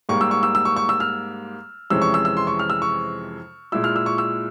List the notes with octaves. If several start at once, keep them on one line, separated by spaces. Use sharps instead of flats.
G#2 G3 A#3 C#6
E6
C#6
E6
E6
C#6
C#6
E6
F6
F2 C3 E3 G#3 C#4 E6
C#6
E6
E6
C6
C#6
F6
E6
C#6
A#2 G#3 E4 E6
F6
E6
C#6
E6